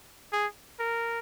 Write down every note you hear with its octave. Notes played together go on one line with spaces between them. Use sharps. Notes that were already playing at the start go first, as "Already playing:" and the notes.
G#4
A#4